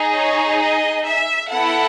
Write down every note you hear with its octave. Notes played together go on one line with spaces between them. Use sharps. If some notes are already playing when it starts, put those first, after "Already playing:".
Already playing: D#4 G#4
C#5
D#5
E5
B3 E4 A4 F#5